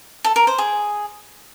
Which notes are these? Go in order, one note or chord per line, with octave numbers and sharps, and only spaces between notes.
A4
A#4
C5
G#4